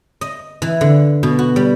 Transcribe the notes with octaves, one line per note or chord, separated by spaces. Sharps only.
D#5
E3
D3
B2
F#4
G3